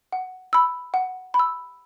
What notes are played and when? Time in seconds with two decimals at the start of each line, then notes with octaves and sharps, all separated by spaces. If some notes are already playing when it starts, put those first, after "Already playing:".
0.12 F#5
0.53 B5 E6
0.94 F#5
1.34 B5
1.39 E6